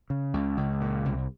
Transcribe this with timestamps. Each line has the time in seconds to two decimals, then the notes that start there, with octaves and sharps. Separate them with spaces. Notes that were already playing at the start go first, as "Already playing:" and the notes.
0.10 C#3
0.34 C#2
0.57 C#2
0.81 A#2
1.05 C2